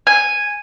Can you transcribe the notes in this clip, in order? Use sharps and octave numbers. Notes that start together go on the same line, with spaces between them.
G#5